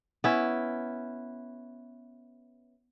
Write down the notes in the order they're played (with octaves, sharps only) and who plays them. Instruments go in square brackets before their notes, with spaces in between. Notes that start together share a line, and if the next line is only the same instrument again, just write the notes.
[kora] B3 C#4 E4